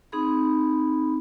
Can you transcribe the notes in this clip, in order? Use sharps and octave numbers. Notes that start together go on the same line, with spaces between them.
C4 D#4 G#4 B5